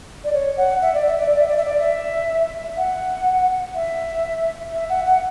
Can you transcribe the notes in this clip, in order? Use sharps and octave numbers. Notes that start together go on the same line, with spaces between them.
D5
C#5
F#5
E5
D5
E5
D5
D5
E5
D5
E5
D5
E5
F#5
E5
E5
F#5
F#5